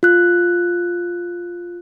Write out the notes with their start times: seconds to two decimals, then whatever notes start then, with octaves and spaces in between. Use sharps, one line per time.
0.03 F4 F#6